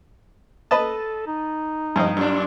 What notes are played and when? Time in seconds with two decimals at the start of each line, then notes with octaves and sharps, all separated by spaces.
0.71 A4 B4 D#5 A5
1.27 D#4
1.96 G2 B2 F3 D#5
2.17 F#2 A#2 D4